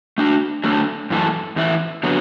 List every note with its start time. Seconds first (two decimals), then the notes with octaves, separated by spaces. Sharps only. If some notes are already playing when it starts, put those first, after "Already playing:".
0.18 A3 D4 F#4
0.64 F#3 A3 D4 A4
1.10 F#2 E3 A3 F#4 A4
1.56 E2 E3 A3 E4
2.03 D3 F#3 B3